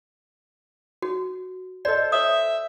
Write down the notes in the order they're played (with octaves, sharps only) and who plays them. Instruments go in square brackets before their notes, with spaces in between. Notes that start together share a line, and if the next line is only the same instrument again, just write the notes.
[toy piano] F#4
[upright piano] A4 C5 [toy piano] D5 D#5
[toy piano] C#5 D#6 [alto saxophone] E5